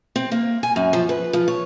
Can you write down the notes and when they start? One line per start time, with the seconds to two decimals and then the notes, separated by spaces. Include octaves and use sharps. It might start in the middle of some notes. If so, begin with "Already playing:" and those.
0.16 C4
0.32 A#3
0.63 G#5
0.76 F#2
0.93 F3
1.09 B4
1.33 F3
1.48 C#5